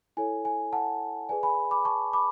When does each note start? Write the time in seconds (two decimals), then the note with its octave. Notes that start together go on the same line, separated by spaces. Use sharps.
0.17 E4 A4 C#5 G#5
0.45 G#5
0.73 F#5 A5
1.29 G#4 B4 D5 G#5
1.43 G#5 B5
1.71 B5 D6
1.85 A5 C#6
2.13 B5 D6